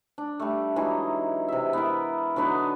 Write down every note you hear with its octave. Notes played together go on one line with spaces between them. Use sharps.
D4
G3 A3
E3 F#3 G#3 D#4
C3 E5
B3 E4 A#4
D3 F#3 B3 D#4